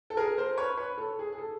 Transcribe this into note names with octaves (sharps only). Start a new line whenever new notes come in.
A4
G#4 A#4
A#4 C5
B4 C#5
B4 C#5
A4
G#4
G#4
A4